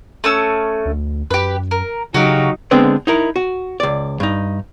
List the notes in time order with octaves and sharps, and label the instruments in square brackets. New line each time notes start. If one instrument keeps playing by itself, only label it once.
[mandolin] A3 C#4 E6
[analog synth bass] D2
[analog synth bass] F#2 [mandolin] G4 B4
[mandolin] A#4
[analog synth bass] C#3 [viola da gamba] F#3 D#4 [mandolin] F#4 G4 F5
[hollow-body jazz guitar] D3 G#3 B3 C4 D4
D#4 E4 A#4
F#4
C#2 D5
G2 D#4